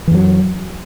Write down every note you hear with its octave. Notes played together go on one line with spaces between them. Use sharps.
F#2 E3 F#3